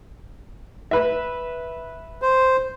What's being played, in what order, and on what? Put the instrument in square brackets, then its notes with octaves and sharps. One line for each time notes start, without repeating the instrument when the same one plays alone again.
[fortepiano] B4 E5
[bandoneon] C5